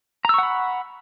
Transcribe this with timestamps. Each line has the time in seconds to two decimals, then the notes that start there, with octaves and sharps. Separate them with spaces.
0.25 A#5
0.29 E6
0.34 C#6
0.38 F#5
0.43 B5